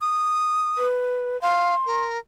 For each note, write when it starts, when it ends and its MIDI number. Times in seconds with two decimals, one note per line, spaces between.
0.01 0.86 87
0.78 1.40 71
1.42 1.75 77
1.42 2.05 84
1.86 2.18 70